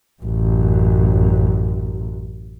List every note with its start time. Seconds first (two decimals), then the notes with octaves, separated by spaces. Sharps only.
0.23 A1 F#2